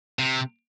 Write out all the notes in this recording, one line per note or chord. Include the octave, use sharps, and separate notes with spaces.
C3